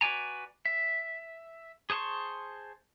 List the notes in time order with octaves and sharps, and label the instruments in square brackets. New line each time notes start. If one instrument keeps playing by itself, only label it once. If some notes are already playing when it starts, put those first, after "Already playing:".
[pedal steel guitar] F#4 B4 D5 G#5 A#5
E5
G#4 C5 A5 C6 C#6